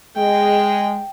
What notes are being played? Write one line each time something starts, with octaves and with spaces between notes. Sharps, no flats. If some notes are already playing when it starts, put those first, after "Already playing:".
G#3 G5